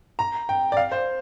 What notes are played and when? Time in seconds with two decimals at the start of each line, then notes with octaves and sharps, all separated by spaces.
0.19 A#5
0.49 G5
0.72 D5
0.77 F5
0.92 C5